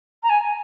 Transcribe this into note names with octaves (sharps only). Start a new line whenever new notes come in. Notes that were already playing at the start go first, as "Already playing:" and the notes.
A#5
G#5